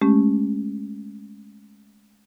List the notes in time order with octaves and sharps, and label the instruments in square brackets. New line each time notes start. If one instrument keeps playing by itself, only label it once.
[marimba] G#3 A3 C#4 G4